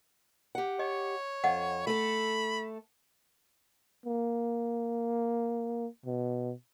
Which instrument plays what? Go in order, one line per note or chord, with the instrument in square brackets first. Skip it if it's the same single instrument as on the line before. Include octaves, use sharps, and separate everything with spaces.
[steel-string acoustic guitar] G4 F#5
[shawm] C#5 [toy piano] D#5
[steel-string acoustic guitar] F2 [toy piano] D#5 F#5
[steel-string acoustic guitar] A3 A4 [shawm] B5
[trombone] A#3
B2